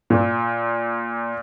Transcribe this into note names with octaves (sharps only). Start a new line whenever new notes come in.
A#2